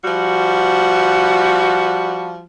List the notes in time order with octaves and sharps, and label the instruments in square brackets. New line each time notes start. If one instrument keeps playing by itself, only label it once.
[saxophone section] F3 G3 F#4